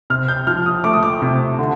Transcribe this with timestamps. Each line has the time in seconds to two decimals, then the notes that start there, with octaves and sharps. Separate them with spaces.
0.10 C3 F6
0.28 G6
0.47 F3 F6
0.66 D#6
0.84 A3 D6
0.93 D#6
1.03 D6
1.22 C3
1.59 D3